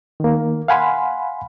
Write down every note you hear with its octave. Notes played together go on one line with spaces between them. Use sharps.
D#3 A#3
F5 F#5 G#5 B5 C6